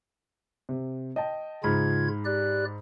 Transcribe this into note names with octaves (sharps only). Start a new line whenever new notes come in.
C3
D#5 G5 A5
G#2 C#3 F4 B5 F6 G#6
G4 D5 F#6